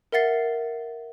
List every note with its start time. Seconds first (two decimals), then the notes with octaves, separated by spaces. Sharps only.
0.12 A#4 E5 F#5 A6 C7